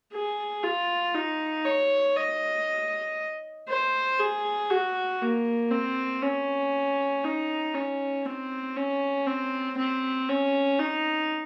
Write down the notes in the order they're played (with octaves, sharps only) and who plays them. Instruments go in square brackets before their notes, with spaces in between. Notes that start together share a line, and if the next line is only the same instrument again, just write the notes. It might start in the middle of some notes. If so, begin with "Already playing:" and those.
[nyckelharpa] G#4
F4
D#4
C#5
D#5
C5
G#4
F#4
A#3
C4
C#4
D#4
C#4
C4
C#4
C4
C4
C#4
D#4